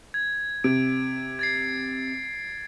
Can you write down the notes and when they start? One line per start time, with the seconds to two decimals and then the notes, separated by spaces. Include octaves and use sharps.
0.14 G#6
0.64 C3 D7
1.39 G#6 A6 C7